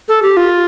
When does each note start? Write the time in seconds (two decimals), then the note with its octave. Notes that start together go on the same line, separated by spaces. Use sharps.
0.08 A4
0.22 G4
0.37 F4